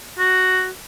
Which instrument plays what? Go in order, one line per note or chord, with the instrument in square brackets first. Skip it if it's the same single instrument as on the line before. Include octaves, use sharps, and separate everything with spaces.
[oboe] F#4